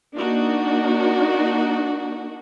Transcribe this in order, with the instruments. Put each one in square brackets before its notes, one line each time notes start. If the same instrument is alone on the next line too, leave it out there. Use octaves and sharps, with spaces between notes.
[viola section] A#3 D4 D#4 F#4